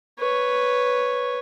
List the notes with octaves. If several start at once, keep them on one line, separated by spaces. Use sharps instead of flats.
B4 C#5